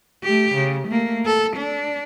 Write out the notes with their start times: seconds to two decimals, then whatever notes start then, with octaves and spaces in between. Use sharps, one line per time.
0.24 A3 G4
0.54 C#3
0.88 A3 A#3
1.26 A4
1.57 D4